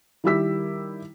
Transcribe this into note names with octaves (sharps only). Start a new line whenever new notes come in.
D#3 G3 E4 G4 E6 B6